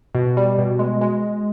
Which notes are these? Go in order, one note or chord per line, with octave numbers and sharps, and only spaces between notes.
B2
G3
B2
G#3
G#3